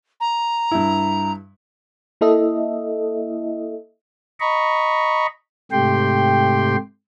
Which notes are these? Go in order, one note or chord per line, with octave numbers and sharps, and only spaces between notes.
A#5
G2 E4
A#3 E4 A4 D#5 E5
D#5 A#5 B5 C#6
G#2 C3 A3 G4 G5 C6